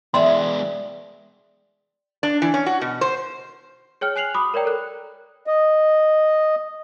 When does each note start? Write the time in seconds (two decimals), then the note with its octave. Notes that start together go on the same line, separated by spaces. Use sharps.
0.14 E3 G#3 B3 D5 E5 G5 C6
2.23 D4
2.42 E3
2.54 C#4
2.66 F#4
2.81 B2
3.01 C5
4.01 G#4 C#5 G5 F6
4.16 G#5 F#6 C7 F7 F#7
4.34 F#4 B5 D6 D#6
4.54 A#4 C#5 D5 G5 A#5
4.65 A4 A#4 F#6
5.47 D#5